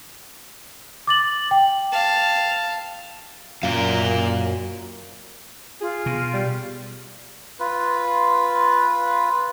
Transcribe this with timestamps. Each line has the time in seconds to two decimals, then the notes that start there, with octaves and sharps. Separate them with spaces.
1.07 D6 A6 F#7
1.51 G5
1.92 F5 A5
3.63 F#2 A#2 A#4 D5 F5
5.81 F4 G#4
6.06 B2
6.33 G3
7.60 F4 B4